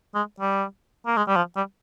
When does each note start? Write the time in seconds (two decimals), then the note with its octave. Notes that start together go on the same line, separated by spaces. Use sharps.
0.14 G#3
0.40 G3
1.06 A#3
1.17 G#3
1.27 G3
1.36 F3
1.56 G3